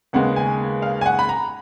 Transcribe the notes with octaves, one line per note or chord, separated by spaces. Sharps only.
D#2 C#3 G#3 B3 F#5
G#5
F5
G#5
F#5
B5
A#5